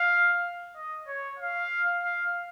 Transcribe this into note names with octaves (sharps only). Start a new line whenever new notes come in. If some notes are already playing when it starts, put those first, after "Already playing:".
Already playing: F5
D#5
C#5
F5
F5